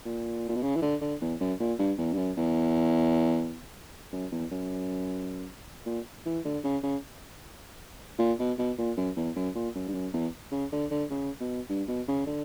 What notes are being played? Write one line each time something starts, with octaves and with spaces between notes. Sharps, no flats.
A#2
A#2
B2
C#3
E3
D3
D3
E2
F#2
A#2
G2
E2
G2
F#2
E2
F#2
E2
F#2
A#2
E3
D3
C#3
C#3
A#2
B2
B2
A#2
F#2
E2
F#2
A#2
F#2
G2
F#2
E2
C#3
D3
D3
C#3
B2
G2
B2
C#3
D3